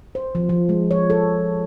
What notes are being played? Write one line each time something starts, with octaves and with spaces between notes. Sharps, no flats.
C5
F3
F3
G#3
C#5
A4